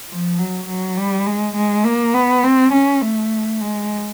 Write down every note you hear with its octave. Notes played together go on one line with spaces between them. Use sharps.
F3
F#3
F#3
G3
G#3
G#3
A#3
B3
C4
C#4
A3
G#3